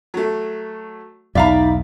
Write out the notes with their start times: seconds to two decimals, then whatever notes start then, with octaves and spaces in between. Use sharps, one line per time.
0.14 F#3 A3
1.35 B1 E2 D#4 D5 E5 F5 A#5 B5